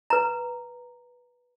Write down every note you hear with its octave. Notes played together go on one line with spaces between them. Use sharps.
B4 A#5